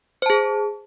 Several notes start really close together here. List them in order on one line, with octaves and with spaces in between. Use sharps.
C5 A5 G#4